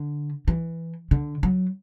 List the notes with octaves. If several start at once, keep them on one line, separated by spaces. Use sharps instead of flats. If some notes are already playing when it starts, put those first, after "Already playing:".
Already playing: D3
E3
D3
F#3